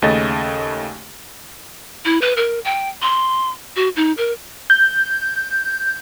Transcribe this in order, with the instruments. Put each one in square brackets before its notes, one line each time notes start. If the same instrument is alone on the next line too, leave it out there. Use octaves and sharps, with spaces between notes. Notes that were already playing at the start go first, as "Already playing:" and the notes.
[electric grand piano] D#2 C#3 A3 D#5 A6
[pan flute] E4
B4
A#4
G5
C6
F#4
D#4
A#4
[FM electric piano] G6